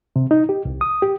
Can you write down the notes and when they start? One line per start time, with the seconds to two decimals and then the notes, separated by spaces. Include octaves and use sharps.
0.16 C3
0.31 D#4
0.49 G4
0.65 C2
0.81 D#6
1.02 G4